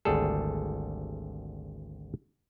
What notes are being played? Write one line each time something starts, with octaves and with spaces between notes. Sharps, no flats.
G#1 D2 G3 G#4 A4